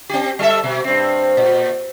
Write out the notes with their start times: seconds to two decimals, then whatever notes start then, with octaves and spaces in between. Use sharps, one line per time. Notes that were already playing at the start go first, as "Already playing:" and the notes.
0.09 C4 G4
0.39 G3 A4 E5
0.64 B2
0.84 G2 C4
1.37 A#2